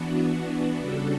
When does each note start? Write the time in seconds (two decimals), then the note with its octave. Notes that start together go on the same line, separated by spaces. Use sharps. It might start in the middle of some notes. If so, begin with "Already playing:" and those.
Already playing: E3 B3 D4 F#4
0.80 C#3 G3 D4 F#4 A4